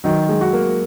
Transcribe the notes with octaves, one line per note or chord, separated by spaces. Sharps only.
D#3 F#3
G#3
F#4
A#3